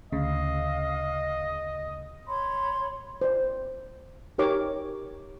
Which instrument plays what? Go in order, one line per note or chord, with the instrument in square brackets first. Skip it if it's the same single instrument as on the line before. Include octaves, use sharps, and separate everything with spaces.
[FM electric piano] D2 C#3 [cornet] D#5 [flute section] F5
[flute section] C#5 B5 C6
[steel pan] C5 D5
D#4 G4 A#4 C#5 D6